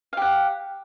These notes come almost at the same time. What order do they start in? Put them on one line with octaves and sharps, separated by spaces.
F5 G4 F#5